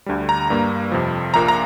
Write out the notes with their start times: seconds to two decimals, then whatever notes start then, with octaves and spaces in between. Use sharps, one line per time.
0.06 D2 D3 G3
0.29 A#5
0.50 G2 G3 A#3
0.92 F2 C3 F3
1.34 A#1 A#2 A#3 A#5
1.48 A#5